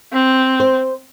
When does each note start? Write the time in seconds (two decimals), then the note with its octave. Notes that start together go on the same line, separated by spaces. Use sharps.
0.13 C4
0.60 C5